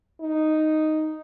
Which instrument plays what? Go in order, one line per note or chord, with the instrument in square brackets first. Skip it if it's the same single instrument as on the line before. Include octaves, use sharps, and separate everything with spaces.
[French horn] D#4